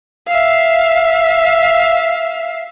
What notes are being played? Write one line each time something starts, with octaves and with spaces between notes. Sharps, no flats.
E5 F5